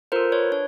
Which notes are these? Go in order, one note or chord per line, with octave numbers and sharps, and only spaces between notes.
F4 A4 A#4 C5
B4 C#5
D4 C#5